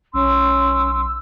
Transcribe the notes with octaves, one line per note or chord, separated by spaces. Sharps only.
B1 C#4 C6 E6